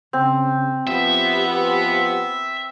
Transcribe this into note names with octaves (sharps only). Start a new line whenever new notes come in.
C#3 C4
F3 B3 G4 E5